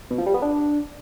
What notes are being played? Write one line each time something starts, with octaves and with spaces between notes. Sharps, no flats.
B2
F3
G3
B3
D4